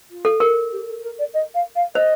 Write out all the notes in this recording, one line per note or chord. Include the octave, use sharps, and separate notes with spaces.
F4
A4
A#4
G4
A4
A#4
D5
D#5
F5
F5
C5 D#5